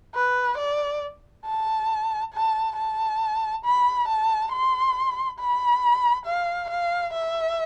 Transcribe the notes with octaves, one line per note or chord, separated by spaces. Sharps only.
B4
D5
A5
A5
A5
B5
A5
C6
B5
F5
F5
E5